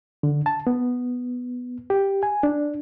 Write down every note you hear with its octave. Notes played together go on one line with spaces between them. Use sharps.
D3
A5
B3
G4
G#5
D4